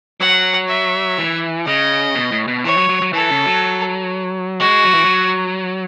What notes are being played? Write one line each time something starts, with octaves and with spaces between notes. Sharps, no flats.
F#3 F#5
E5
E3
C#3 D#5
B2
A2
B2
E3 C#5
F#3
F#3
F#3
E3 A4
C#3
F#3
G#3 F#4
F#3
E3
F#3